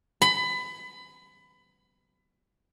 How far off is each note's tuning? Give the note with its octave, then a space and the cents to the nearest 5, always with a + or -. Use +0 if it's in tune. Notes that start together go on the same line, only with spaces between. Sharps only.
B5 +25